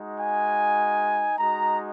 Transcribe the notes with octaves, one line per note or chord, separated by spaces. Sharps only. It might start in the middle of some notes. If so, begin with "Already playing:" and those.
Already playing: G#3 D#4 F#4
G#5
G#3 D#4 F#4 A#5